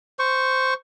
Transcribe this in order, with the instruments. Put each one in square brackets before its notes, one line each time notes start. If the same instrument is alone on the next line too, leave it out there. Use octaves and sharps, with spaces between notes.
[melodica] C5 C#6